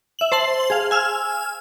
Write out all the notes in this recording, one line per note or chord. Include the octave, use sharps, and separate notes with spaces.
E5 F#7
C5 A5 C6 F#7
G#4 F5
G#5 E6 F6